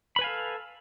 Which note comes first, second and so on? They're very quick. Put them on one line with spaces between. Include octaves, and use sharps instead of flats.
B5 B4 G#5 F5 A4